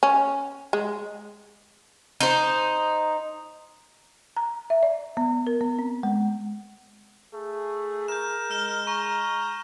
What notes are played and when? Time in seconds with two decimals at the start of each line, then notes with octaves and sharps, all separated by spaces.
0.03 C#4
0.73 G#3
2.21 D#4 C5
4.37 A#5
4.70 E5
4.83 D5
5.17 B3
5.47 A#4
5.61 B3
5.79 C4
6.03 G#3
7.34 A3 G#4
8.08 A#4 G6 E7
8.51 G#3 F6 E7 G7
8.87 A#5 C#6